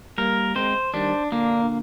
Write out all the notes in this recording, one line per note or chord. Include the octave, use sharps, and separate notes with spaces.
G3 A#3 A#4
G#3 C4 C5
D#3 G3 D4
A#2 D3 A#3